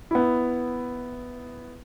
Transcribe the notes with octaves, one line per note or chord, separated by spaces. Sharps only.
B3 E4